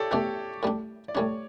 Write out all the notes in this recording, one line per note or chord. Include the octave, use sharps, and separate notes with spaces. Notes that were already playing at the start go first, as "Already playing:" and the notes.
Already playing: G4 A4 C#5 D5
B2 A3 D4 G4
A2 G3 D4
D5
A2 G3 D4 C#5